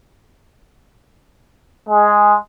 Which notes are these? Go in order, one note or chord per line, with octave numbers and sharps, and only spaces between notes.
G#3